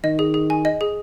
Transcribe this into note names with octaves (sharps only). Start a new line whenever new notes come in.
D#3 D#5
G#4
G#4
G#5
D#5
G#4